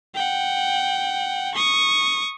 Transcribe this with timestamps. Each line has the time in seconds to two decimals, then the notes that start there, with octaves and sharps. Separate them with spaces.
0.15 F#5 G5
1.55 C#6 D#6